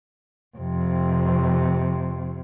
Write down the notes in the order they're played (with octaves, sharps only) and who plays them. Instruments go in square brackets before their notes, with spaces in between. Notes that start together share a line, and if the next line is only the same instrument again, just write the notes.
[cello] F2 C3